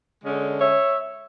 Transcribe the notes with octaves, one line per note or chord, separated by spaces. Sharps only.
D3 G#3 C#4
C#5 E5